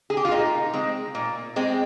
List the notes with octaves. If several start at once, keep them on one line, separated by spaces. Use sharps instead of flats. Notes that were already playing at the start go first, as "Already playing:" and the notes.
G#4
G4
F4
A#2 D#4
G#3 C4
A#2
G#3 C4